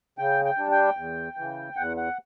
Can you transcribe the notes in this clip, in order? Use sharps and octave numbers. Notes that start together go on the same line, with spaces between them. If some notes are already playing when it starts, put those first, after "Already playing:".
C#3 G5
G5
G3 D4
G5
E2
C#3 E3
E2 F#5
F#5